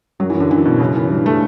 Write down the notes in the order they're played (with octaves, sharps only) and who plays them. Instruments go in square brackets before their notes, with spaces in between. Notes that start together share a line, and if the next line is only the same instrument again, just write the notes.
[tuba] F#2 [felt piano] F#3
[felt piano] E3
D3
E3
B2
[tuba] F#2 [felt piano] C#3
[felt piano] E3
[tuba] G2
[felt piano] A3